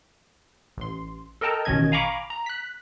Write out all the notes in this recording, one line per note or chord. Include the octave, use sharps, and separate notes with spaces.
A1 C6
A4 A#4 D#5 G5 A5 A#5
A1 B2 D#3 C#4 D#5 G#6
F5 G#5 A#5 B5 C#6 D6
A#5
F#6 B6